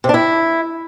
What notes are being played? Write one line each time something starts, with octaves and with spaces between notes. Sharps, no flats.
C3
D4
E4